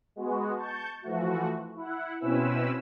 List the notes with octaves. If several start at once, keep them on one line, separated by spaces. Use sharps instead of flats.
G#3 B3 F#4
A5 C#6 G6
E3 F3 A3 F#4
E4 F#5
B2 C4 C#4 E4 B4 E6